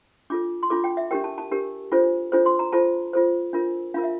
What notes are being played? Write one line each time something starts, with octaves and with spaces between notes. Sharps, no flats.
D4 F4 A4 D6
C6
D4 F4 A4 D6
G5
E5
D4 G4 A#4 G5
A5
A5
D4 G4 A#4
D4 F4 A4 C5
D4 F4 A4 C5
C6
A#5
F4 A4 C5 A5
F4 A4 C5
D4 F4 A#4
D4 F4 A#4 F5
E5